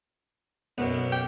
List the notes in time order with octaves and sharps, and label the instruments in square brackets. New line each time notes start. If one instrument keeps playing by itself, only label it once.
[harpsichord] B1 F#2 B2 [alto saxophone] B3
[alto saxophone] G5